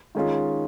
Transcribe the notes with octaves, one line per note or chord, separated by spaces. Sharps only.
D#3 G#3 C#4 F4 G#4